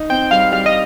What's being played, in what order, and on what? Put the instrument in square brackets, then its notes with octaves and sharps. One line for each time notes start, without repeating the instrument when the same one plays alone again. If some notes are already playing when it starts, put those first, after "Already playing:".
Already playing: [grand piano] D#4
[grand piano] C4 [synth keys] G5
[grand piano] G3 [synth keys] F5
[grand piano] G3 [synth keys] F5
[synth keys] D#5